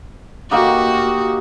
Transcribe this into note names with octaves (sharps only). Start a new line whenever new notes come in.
A#3 D#4 F#4 G4